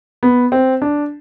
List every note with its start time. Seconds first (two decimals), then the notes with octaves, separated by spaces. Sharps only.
0.23 B3
0.52 C4
0.82 D4